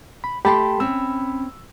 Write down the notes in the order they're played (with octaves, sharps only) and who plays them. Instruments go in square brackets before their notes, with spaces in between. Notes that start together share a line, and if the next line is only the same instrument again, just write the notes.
[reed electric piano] B5
[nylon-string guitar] A3 A4 G5 [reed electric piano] G4 A5 C6 [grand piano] B5
[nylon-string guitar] C4 C#4 [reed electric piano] E6